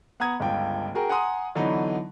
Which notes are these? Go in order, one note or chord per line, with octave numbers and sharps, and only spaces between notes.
B3 F#5 A#5 D#6 G#6
G1 C#2 G5
F#4 G#4 A#4 G5
F#5 G#5 A#5 C6 D#6
D3 E3 F#3 B3 D#4